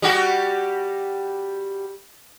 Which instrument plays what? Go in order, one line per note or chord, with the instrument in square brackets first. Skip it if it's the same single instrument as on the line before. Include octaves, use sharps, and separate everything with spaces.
[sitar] G3 F#4 G4